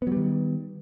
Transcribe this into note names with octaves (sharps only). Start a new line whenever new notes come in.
D#3 F#3 G3 B3